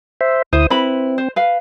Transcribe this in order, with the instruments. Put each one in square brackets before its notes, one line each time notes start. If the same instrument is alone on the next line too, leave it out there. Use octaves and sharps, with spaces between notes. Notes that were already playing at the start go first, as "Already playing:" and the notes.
[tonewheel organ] C5 E5
[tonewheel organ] D2 E4 D#6 [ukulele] C5
[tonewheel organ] C4 [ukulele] E4 B4 B5
[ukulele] C5
B4 F5